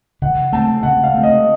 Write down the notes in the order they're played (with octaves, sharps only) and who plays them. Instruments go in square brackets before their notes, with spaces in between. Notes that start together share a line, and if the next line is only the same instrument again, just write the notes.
[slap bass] C#3 [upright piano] F#5
[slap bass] A3 C4 [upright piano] A5
[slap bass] C#3 [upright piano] F#5
[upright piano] F5
[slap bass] A3 C4
[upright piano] D#5